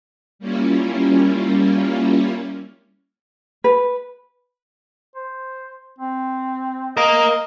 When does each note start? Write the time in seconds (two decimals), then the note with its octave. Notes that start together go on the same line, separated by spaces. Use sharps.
0.39 G3 A#3 C#4 E4 F4
3.64 B4
5.15 C5
5.99 C4
6.97 A#4 D#5 F5